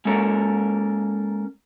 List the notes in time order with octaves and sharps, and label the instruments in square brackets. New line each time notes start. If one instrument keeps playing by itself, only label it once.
[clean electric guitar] G#3 A#3 C#4 A4 A#4